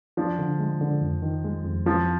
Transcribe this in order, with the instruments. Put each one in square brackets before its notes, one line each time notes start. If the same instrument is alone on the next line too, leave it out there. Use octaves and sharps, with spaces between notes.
[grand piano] F3 [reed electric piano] D4
[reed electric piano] D3
G#3
D3
F2
D#3
G#3
F2
[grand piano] F3 [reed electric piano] C4